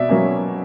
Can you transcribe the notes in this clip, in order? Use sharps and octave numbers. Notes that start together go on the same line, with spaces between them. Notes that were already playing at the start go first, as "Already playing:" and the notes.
Already playing: B2 D5 E5
F#3 A#3 C#4